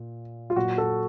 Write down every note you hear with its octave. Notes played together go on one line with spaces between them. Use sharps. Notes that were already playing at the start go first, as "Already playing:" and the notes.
Already playing: A#2
F4
A#2 F#3 F#4
A4